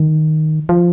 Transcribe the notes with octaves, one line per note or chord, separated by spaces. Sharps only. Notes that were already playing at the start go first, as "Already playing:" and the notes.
Already playing: D#3
F3